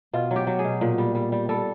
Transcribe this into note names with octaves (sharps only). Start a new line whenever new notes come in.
B2 F4
F#3
G4
F#3
G#4
B2
A#2
G3
G3
G3
G3 A4